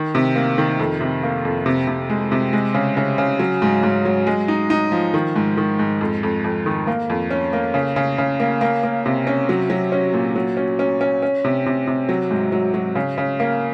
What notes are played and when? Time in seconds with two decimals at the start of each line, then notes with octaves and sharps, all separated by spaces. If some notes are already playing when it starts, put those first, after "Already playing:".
Already playing: D#3
0.15 C3
0.36 A#3
0.58 D#3
0.79 F2
1.01 C3
1.23 A#3
1.45 F2
1.66 C3
1.87 C3
2.10 G#3
2.32 C3
2.53 G#3
2.75 C#3
2.97 C#3
3.18 C#3
3.39 F#3
3.62 G#2
3.83 G#2
4.05 F#3
4.27 G#3
4.48 D#4
4.70 D#4
4.92 F3
5.14 D#3
5.36 G#2
5.57 D#3
5.79 G#2
6.01 F2
6.23 F2
6.44 F2
6.66 D#3
6.87 A#3
7.10 F2
7.31 C#4
7.53 A#3
7.74 C#3
7.96 C#3
8.18 C#3
8.40 A#3
8.61 A#3
8.83 A#3
9.06 C3
9.27 C#4
9.49 F#3
9.70 F#3
9.92 C#4
10.13 A#2
10.36 F#3
10.57 C#4
10.79 C#4
11.01 C#4
11.22 C#4
11.44 C3
11.66 C3
11.87 C3
12.09 F#3
12.31 G#2
12.52 F#3
12.74 F#3
12.96 C#3
13.18 C#3
13.40 A#3